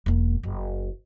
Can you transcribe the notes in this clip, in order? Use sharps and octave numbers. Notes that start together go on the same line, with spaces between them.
E1 A#3
F#1